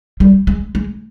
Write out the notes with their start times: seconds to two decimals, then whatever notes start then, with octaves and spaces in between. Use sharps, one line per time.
0.20 G3
0.47 G#3
0.75 G#3